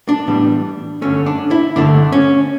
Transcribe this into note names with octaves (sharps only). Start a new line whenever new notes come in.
D4
A2 E3 G3 B3
G2 D3 A3 C#4
D4
E4
G2 D3 A3 D4
C#4